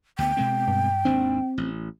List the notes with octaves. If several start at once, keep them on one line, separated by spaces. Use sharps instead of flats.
D2 B3 G5
B2 G#3 C4
G2
G#1 D#2 C4 D4
A1